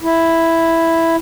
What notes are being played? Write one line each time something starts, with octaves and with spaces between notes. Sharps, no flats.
E4